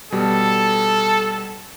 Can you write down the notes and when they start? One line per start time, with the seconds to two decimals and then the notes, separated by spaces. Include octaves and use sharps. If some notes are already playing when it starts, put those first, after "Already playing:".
0.12 B2 G3 A4